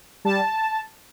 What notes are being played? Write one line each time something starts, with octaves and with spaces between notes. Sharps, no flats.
G3 A5